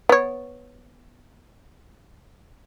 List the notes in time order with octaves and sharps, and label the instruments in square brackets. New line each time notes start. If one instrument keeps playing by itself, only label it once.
[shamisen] B3 C#5